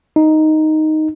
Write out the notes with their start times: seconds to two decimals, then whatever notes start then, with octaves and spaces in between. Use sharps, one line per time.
0.16 D#4